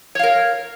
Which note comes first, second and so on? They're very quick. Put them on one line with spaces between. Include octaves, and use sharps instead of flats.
C#5 F5 A#4